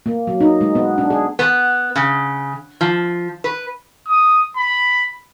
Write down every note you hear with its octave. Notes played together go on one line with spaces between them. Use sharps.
A#3
F#3
D#4
G#3
B3
D4
G#4
B3
C#3
F3
B4
D#6
B5